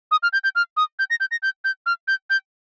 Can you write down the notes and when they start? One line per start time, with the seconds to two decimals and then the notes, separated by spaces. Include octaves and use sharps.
0.11 D#6
0.23 F6
0.33 G6
0.44 G6
0.55 F6
0.77 D#6
0.99 G6
1.10 A#6
1.20 G6
1.31 A#6
1.43 G6
1.64 G6
1.86 F6
2.08 G6
2.30 G6